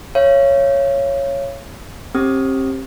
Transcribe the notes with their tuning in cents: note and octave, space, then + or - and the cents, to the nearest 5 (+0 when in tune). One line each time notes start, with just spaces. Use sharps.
C#5 +0 F5 -40
C4 +35 G4 +0 D#6 +0